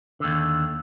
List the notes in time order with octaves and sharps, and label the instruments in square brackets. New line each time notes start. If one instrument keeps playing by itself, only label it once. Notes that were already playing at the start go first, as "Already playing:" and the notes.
[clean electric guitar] D#2 D3